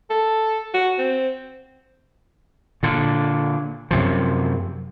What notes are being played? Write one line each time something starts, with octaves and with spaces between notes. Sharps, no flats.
A4
F#4
C4
A#2 D3
F#2 C3 F3